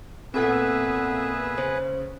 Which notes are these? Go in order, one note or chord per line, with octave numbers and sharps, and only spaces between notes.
A#2 B3 C4 G#4 A4 B4 E5 F#5
C#3 C5